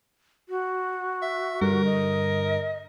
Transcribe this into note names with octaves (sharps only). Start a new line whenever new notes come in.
F#4
E5
G2 D3 A#4
D#5